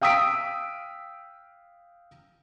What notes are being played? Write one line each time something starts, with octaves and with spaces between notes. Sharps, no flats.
F5 G5 D#6 E6 B6 D7